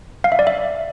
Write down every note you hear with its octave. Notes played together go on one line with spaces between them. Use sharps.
F5
E5
D5
E5